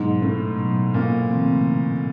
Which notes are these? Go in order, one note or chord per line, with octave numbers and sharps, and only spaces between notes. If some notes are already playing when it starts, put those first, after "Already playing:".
Already playing: G#2 B2 F#3 B3 D#4
A2
B2 F#3 B3 D#4
A#2
C#3 E3 A3 C4